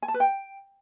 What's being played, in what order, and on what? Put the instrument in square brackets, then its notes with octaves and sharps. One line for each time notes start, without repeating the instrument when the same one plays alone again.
[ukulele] G#5
A5
B4
G5